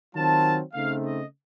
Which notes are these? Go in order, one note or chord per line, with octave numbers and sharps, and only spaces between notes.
D#3 F#3 C4 F4 A5
C#3 A3 C4 D#4 F5
D#5